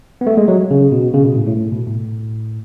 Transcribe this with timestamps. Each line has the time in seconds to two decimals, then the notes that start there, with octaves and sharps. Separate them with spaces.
0.21 B3
0.27 A3
0.37 G#3
0.48 F#3
0.71 C#3
0.92 B2
1.14 C#3
1.25 B2
1.35 A2
1.47 A2
1.57 A2
1.72 B2
1.87 A2